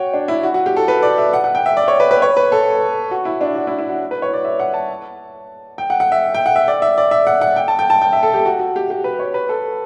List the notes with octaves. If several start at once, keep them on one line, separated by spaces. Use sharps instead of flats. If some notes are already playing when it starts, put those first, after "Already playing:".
Already playing: F#4 C#5 G5
D4
E4
F#4
F#4
G4
A4
B4
D5
E5
F#5
F#5
G5
E5
D5
C#5
B4
B4
C#5
B4
A4
F#4
E4
D4
F#4
E4
E4
F#4
B4
C#5
D5
E5
F#5
A5
G5
F#5
F#5
E5
G5
F#5
E5
D5
E5
D5
E5
F#5
F#5
G5
A5
G5
A5
G5
E5
A4
G4
F#4
F#4
G4
G4
B4
C#5
B4
A4